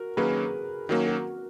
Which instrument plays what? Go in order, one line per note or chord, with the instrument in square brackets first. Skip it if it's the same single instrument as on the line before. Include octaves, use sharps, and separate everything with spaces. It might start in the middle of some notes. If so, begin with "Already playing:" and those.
Already playing: [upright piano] F#4 A#4
[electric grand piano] D#3 F#3 A#3 C#4 [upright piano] G#4 B4
[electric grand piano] D#3 F#3 A#3 C#4 [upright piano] F#4 A#4
[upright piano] F#4 A#4